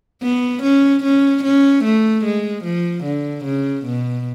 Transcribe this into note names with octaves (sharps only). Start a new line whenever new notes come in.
B3
C#4
C#4
C#4
A3
G#3
F3
D3
C#3
B2